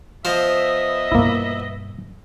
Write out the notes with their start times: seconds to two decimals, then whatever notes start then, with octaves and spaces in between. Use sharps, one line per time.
0.25 F3 B3 C5 D#5 E5
1.12 G2 B2 A#3 E4